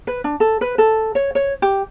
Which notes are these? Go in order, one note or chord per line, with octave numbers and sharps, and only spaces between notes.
B4
D4
A4
B4
A4
C#5
C#5
G4